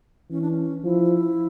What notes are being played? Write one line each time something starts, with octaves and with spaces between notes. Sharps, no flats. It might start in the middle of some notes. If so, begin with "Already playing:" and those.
E3 C#4
D4
C#4
F3 E4